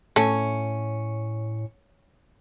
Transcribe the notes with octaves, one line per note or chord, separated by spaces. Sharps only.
A2 A3 C#4